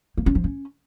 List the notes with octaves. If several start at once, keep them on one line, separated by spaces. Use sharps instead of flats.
A#3
C#4
F3
C#4